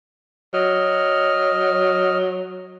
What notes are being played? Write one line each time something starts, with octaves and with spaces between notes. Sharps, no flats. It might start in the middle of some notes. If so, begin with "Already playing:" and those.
F#3 D#5 F6